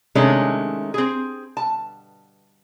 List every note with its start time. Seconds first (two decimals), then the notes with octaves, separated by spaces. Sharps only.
0.15 C3 D#3 G#3 A3 C#4 D4
0.94 C4 G#4
1.57 A5